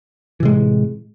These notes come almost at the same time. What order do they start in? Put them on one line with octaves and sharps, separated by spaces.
E3 C3 G#3 A2